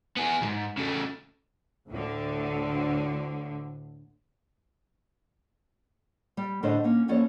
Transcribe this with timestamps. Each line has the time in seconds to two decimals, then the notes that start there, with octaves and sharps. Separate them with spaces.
0.16 B3 G#4
0.41 D2 G#2
0.77 C#3 A3
1.89 D2 A2 D3
6.37 G3
6.63 A2 D3 D4 C5 C#5 D#5
6.84 A#3 C#4
7.08 E2 F3 A#3 C#4 C#5 D5